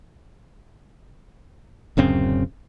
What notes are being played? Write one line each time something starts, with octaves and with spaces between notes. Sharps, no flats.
D1 F#2 C#3 C4